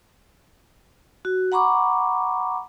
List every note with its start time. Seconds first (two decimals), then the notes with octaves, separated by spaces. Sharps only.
1.25 F#4
1.52 F#5 A#5 B5 C#6 D6